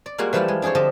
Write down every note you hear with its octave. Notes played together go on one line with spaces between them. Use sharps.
D5
G3 G#3 A#3 F4 F#4
E3 F3 G3 A3 E4 F4
G#3
D4 G#4 A4 C5 C#5
D3 F3 G4 A4 D#5 E5